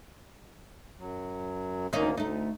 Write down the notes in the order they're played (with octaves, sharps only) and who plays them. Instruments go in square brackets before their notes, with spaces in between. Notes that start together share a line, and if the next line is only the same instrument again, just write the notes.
[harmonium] F#2 F#3
[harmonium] D2 A#3 [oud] D#3 C#4 D#4
[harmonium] D2 [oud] A3 D#4